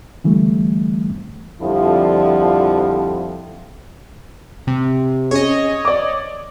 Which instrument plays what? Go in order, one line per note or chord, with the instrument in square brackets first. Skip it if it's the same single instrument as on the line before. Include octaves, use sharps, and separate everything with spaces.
[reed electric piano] D3 E3 G3 A3
[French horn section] F2 D3 F3 G3 E4
[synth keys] C3
[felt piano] C#4 G#4 [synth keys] C#5 D#5
[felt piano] D5 D6